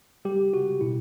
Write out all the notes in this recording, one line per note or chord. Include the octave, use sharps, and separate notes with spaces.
G3 G4
G3 F#4
B2 E4